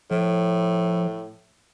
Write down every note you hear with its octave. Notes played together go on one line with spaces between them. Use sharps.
A2 F3